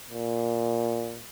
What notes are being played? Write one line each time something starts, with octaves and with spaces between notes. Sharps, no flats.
A#2